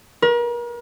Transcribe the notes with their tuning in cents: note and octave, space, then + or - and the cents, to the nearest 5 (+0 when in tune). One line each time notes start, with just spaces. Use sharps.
A#4 +40